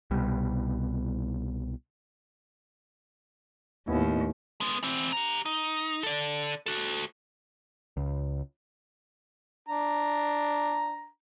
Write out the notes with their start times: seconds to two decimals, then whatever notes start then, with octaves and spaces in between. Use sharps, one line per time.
0.11 C2 B2 G3
3.88 D#2 A2 B3 E4
4.61 G#3 B3
4.83 E3 C4
5.13 G4 A#5
5.46 D#4
6.03 A4 D5
6.66 F#4 A4
7.97 C#2
9.69 D4 A#5